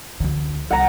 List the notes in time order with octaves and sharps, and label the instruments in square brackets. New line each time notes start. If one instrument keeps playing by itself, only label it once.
[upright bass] D2 D3
[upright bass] C2 [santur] F#5 A#5